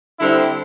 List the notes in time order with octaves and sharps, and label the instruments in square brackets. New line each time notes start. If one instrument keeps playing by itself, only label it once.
[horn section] D3 G3 C4 E4